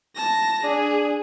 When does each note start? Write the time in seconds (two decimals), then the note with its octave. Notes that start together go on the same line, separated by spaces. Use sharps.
0.15 A5 A#6
0.64 D4 G#4